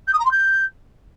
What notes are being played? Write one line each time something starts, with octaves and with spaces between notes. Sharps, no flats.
G6
D#6
A#5
C6
G6